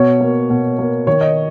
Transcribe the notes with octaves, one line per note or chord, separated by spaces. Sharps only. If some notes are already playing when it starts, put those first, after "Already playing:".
Already playing: B2 C#5
A#3
B2
A#3
D#3 C#5
D#5